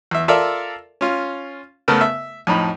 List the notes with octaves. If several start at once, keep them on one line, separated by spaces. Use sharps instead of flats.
E2 E5
F4 A4 A#4 D5 E5 F5
C#4 F4
C#3 A3 B3 A#4
E5
F2 A2 D#4 B5